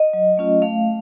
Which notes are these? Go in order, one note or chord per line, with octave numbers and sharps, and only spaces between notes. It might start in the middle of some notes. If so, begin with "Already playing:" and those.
Already playing: D#5
F#3
A3 C#4 F4
A3 F5